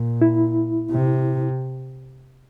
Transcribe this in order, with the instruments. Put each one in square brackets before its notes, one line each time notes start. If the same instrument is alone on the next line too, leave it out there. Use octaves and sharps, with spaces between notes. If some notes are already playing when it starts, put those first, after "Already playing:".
Already playing: [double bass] A#2
[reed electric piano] E4
[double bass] C3